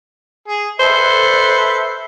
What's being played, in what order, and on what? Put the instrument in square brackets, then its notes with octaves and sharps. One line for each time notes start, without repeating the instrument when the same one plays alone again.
[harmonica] G#4
[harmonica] A4 B4 E5 [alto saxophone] C5